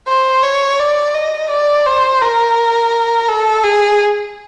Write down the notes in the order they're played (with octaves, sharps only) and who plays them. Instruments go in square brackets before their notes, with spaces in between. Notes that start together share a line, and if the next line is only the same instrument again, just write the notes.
[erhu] C5
C#5
D5
D#5
D5
C5
A#4
A4
G#4